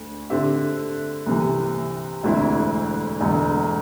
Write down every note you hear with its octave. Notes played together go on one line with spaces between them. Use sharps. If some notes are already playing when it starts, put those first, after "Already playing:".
Already playing: D2 D3
D3 C4 G4 E5
C2 C3 E3
E1 D2 D3 C4 E4
E1 E2 D3 A3